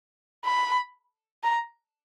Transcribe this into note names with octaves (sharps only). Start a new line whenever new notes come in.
B5
A#5